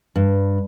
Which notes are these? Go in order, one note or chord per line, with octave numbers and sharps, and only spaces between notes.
G2